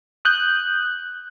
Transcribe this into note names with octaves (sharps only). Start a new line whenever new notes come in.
D#6 F#6 G6